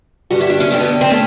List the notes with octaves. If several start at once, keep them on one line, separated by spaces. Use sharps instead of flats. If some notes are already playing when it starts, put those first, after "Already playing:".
G2 D3 G3 F#4
E4
D4
C#4
G2 D3 G3 C4
B3
C4
A3 C#4